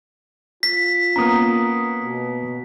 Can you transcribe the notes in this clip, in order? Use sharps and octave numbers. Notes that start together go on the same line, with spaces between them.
F4 B6
A#3 B3 C#4 A#5 D#6
B2